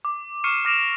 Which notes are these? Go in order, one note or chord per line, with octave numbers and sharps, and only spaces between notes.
D6
C#6 F6 C7 C#7 D#7 E7
D6 F6 A#6 D7 E7 F7